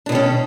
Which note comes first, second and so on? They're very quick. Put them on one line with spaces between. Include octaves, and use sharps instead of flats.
D4 B2 D#3 C#4